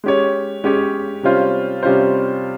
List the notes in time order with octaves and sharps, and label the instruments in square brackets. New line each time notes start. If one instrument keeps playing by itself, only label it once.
[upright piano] G#3 C#4 G4 C#5
G#3 C#4 G4 C#5
C3 G3 C#4 F4 C5
C3 G3 C#4 F4 C5